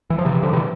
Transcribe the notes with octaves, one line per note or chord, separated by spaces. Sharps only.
E3
F3
C3 E3
D3 F3
C3 E3